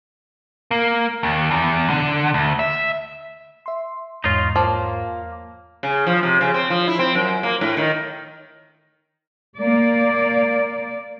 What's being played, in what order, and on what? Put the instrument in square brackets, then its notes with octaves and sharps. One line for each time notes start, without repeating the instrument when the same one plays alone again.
[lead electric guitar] A#3
D#2
E2
D3
D2
E5
[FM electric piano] E5 C6
[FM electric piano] E2 G#2 C#5 [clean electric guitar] D#4 F4
[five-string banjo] F3 [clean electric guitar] A#3
[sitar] C#3
F3
C3
C#3
C4
F3
E4
C4
F#2
A#3
A2
D#3
[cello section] A#3 D5